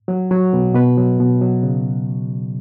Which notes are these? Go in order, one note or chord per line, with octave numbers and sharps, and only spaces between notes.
F#3
F#3
B2
B2 B4
F#3
B2
F#3
C#3